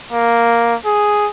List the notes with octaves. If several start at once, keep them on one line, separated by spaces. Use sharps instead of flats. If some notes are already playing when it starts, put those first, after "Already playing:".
A#3
G#4